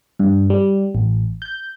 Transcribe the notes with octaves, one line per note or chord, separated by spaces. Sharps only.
G2
G3
A1
G6